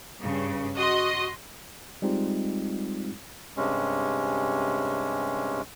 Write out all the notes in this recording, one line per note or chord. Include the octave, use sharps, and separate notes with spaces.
G2 C#3
F#4 D#5 C6
G3 G#3 C4 D#4 F4
G2 C3 G#3 C#4